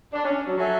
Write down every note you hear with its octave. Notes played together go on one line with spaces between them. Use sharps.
D4
C#4
F#3
F#3 F#4 A4 E5 G#5